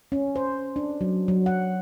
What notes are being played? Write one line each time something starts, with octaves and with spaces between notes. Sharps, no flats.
C#4
C5
D4
F#3
F#3
F#5